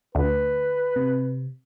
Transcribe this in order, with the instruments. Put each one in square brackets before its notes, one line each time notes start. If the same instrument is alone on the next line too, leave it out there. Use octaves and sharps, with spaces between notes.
[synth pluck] D2 [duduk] B4
[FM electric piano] C3